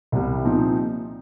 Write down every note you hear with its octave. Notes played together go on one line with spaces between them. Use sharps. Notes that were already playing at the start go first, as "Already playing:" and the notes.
C2 C3 G3
A#2 F3 C4 D#4